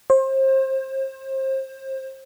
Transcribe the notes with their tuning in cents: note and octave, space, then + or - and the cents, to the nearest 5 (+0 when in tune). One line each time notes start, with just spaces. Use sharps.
C5 +30